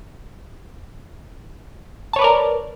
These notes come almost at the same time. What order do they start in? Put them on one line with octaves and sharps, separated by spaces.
A5 C#5 B4 D5 A#4